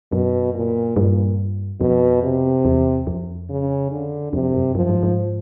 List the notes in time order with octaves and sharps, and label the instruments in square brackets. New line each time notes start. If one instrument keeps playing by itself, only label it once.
[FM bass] F#2 [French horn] B2
[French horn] A#2
[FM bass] G2 [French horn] A#2
[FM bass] F2 [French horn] B2
[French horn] C3
[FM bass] E2
F2
[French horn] C#3
D3
[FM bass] F2 [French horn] C3
[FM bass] F#2
[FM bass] F#2 [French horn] F3
[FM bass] G#2
G#2